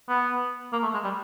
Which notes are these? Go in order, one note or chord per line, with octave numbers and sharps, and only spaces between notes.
B3
A#3
A3
G#3
G3